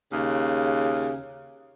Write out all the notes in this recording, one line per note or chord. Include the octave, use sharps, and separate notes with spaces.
D#2 C#3